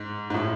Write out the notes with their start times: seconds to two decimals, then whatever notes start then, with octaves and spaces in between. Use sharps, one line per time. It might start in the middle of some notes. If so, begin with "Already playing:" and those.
Already playing: G#2
0.30 G#2
0.34 A2